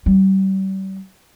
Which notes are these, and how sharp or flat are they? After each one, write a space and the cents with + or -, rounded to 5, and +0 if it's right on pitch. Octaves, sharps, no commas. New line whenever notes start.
G3 -35